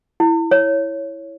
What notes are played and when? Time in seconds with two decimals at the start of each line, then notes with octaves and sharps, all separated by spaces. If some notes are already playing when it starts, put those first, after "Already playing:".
0.20 E4
0.51 C#5